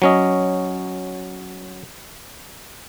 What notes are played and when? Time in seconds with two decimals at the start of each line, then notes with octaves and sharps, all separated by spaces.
0.02 F#3 C#4 D#5